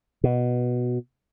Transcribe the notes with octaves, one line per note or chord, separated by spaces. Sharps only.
B2